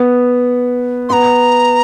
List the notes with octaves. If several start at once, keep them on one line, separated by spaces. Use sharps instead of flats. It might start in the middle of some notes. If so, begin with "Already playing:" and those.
Already playing: B3
B3 A#5 C6